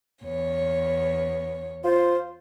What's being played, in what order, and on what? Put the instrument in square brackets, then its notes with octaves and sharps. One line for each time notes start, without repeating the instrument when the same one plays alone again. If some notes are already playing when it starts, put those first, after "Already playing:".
[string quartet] E2 C#5
[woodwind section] F4 C5